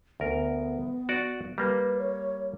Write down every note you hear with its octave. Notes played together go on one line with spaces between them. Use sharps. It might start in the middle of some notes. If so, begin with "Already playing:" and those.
D2 B3 A#4
F#4 D5
G3 A#3 B4
C#5